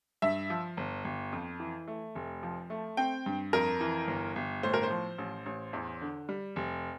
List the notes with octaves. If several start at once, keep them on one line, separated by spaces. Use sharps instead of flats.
G2 E5
F3
G1
G1
F2
E3
A3
F1
F3
A3
C4 G5
G2
F2 A#4
E3
G1
G1
A2 C5
A#4
C5
F3
A1
A1
E2
D3
G3
F1